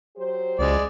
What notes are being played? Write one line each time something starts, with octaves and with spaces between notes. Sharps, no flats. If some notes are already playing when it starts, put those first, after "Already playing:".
F#3 G4 C5
C#2 G#3 D5